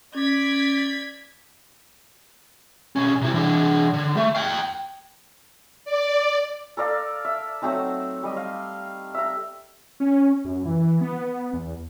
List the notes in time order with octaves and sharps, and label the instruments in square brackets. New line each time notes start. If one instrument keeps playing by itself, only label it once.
[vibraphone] C#4 [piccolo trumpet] D5 [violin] G#6 B6
[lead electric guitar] B1 C#4
C3 E4
E3 D4
D3
A3
F5 G5
[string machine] D5
[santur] A4 A#4 D5 F5
E5
F#3 A3 C4 D#4
G3 D#5
F5
E5 A#5
[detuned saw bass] C#4
F#2
E3
B3
E2